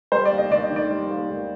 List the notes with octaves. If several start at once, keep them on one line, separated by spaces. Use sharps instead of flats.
G3 C5
D5
D#2
D#5
D#2 D5
D#5
D#3
D5
G3
D#2
D#2